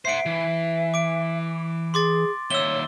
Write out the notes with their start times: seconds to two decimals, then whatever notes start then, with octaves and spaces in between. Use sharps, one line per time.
0.05 C5 E5 F#5 C7 D7
0.26 E3
0.94 D6 D7
1.94 G#4 C6 D6 A6
2.51 D#2 C#5 E5 E6 G7